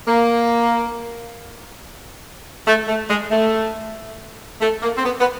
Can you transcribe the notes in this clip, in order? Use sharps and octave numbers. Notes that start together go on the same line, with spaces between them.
A#3
A3
A3
G#3
A3
A3
A#3
C4
B3
B3